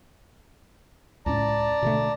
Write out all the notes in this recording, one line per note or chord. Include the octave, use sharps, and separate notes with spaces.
C#2 A2 C#4 D5 A5 A#5
B2 D3 A3